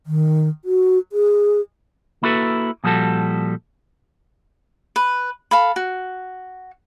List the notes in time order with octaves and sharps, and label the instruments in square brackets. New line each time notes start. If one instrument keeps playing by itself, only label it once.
[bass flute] D#3
F#4
G#4
[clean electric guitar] A#3 E4 F#4 A4 B4
A#2 F3 G3 F#4 A4
[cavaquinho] B4
A4 F5 B5
F#4